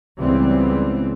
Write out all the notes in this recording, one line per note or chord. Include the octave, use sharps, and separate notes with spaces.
C#2 C#3 E3 G3 B3 C4